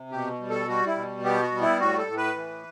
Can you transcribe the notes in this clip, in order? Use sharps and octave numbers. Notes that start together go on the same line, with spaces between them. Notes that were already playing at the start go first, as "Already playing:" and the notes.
Already playing: C3
B2 G4
G3
A4
G3 F#4
E4
B2
B3 G4
F#4
G3
E4
A2 F#4
A4
A2
B4
E3